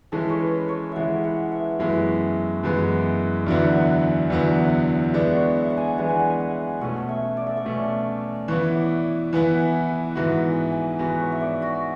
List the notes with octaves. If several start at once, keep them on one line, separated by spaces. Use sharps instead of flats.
E3 G#3 C#4 E4 A4
C#5
B4
C#5
E3 G#3 C#4 E4 E5 F#5
F#5
E5
F#2 E3 G#3 B3 E4
F#2 E3 G#3 B3 E4
D5
E2 D3 F#3 B3 E4 E5
E5
G#5
E2 D3 F#3 B3 E4 F#5
F#5
E5
E5
E5
E3 G#3 B3 D4 D5
C#5
E5
F#5
G#5
E3 G#3 B3 D4 F#5
G#5
F#5
G#5
F#5
B2 A3 C#4 F#5
E5
D5
E5
D5
B2 A3 C#4
E3 B3 E4 C#5
E5
D5
E3 B3 E4 G#5
F#5
G#5
E5
G#2 E3 B3 F#4 F#5
E5
G#5
G#2 E3 B3 F#4 F#5
C#5
E5
D5
F#4